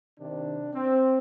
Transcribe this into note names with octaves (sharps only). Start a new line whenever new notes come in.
C3 D#3 D4
C4